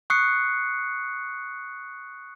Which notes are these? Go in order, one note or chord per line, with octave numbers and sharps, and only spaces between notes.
C#6 D#6 F#6 C7 C#7